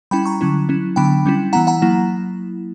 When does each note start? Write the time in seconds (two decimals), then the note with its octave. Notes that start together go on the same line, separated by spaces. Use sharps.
0.11 G3 C#4 E4 G5 B5
0.25 A#5 C#6
0.41 D3 F#3 C#4 E4
0.69 F#3 C#4 E4
0.96 D3 F#3 B3 D4 G5 B5
1.26 G3 C#4 E4
1.53 E3 B3 E4 F#5 A#5
1.67 F#5 A#5
1.82 F#3 A#3 E4